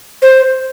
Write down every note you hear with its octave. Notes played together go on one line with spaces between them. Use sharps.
C5